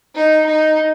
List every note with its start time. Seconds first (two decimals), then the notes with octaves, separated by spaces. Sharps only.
0.15 D#4
0.46 D#4